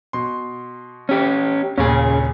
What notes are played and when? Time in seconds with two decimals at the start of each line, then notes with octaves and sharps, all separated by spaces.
0.13 B2 C6
1.09 C#4 G4
1.78 D#2 A#2 C#3 C#4 G#4